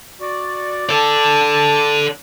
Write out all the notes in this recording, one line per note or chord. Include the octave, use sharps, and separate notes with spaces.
F#4 D5
A4 D5 A5